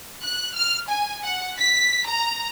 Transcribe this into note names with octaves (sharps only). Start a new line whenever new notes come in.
F#6
F6
G#5
F#5
B6
A#5